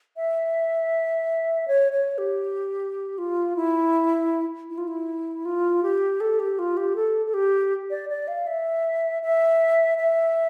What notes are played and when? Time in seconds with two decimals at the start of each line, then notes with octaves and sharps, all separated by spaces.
0.17 E5
1.68 C#5
1.92 C#5
2.18 G4
3.18 F4
3.56 E4
4.70 E4
4.78 F4
4.88 E4
5.45 F4
5.83 G4
6.20 A4
6.39 G4
6.59 F4
6.77 G4
6.96 A4
7.26 A4
7.34 G4
7.90 D5
8.09 D5
8.28 F5
8.47 E5
9.23 E5
9.98 E5